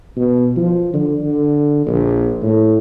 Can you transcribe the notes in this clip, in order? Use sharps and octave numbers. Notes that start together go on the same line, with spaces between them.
B2
F3
D3
D3
A#1
A2